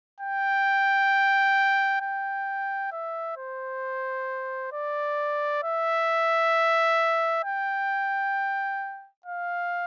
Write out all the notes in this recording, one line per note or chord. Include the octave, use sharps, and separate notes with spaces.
G5
G5
E5
C5
D5
E5
G5
F5